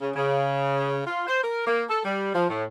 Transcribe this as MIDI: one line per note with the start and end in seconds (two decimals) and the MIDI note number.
0.01 0.11 49
0.16 1.01 49
1.07 1.25 65
1.27 1.42 72
1.43 1.66 70
1.67 1.84 58
1.90 2.00 69
2.05 2.31 55
2.35 2.47 53
2.50 2.64 45